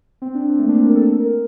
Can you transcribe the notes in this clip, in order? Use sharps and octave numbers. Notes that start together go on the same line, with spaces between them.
C4
D4
C4
A3
A#3
D4
C4
A#4
A4
A#4